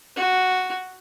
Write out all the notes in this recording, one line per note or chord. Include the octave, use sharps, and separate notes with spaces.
F#4